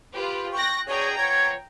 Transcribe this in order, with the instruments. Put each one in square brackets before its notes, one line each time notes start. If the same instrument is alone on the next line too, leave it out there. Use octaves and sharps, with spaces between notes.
[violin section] F4 G4 B4
[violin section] G5 F#6 A#6 [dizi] C#6
[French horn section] B2 D4 G#4 [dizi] C#5 [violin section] G5 A#5
[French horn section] F3 B3 C#5 [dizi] G#6